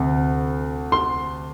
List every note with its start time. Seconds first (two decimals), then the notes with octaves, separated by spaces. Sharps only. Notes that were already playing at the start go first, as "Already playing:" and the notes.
Already playing: D2 C3
0.92 C6